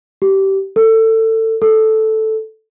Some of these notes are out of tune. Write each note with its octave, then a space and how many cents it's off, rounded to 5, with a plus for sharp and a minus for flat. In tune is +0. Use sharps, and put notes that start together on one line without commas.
G4 -20
A4 +25
A4 -5